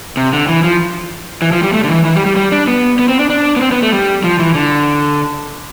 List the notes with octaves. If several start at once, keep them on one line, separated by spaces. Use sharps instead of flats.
C3
D3
E3
F3
E3
F3
G3
A3
D3
E3
E3
G3
G3
G3
D4
B3
B3
C4
D4
D4
B3
C4
B3
A3
G3
F3
E3
D3